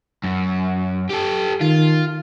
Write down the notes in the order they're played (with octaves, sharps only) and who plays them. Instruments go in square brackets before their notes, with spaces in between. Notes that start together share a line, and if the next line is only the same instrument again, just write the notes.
[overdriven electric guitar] F#2
G4 A4
[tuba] D#3 [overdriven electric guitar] F4